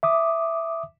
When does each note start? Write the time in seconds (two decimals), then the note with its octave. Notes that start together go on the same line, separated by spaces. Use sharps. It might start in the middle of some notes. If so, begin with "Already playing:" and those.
0.03 E5 D6 D#6